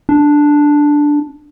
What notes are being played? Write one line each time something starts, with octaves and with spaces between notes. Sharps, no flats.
D4